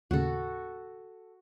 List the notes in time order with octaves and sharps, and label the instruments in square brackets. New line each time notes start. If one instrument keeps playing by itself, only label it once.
[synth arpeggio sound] D#2 A2 C#3 [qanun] F#4 A4